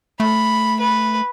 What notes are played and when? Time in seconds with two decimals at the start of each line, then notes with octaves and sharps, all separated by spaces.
0.20 A3 B5
0.80 B4